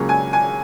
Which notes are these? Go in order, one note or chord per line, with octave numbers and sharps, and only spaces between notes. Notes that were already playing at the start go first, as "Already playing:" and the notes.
Already playing: C#2 C#3 F#3 A#3 C#4
G#5
G#5